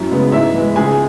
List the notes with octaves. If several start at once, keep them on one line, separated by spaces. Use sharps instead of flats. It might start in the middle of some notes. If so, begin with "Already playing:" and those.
Already playing: F#2 E4
C#3 G#3 B3
G#2 E4 E5
E3 G#3
C#2 G#4 G#5